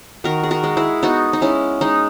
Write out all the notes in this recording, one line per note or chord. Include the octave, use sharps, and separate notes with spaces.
D#3 F#4 A#4
G#4
F#4 A#4
G#3
E4 G#4
B3 D#4 F#4
D#4
G#3 C#4 E4
G#3 D#4